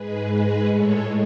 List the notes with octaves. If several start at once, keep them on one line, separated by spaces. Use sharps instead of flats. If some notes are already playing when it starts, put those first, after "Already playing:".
Already playing: G#2 G#3 G#4 B4
G#4 B4
A2 G#3 A4 C#5